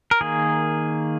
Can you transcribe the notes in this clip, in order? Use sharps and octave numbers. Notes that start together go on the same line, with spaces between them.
A#4
D#3 A#3 G#4